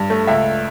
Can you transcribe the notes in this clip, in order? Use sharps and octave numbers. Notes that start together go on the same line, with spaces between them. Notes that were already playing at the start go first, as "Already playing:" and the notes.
Already playing: G2
A3
C#2 E5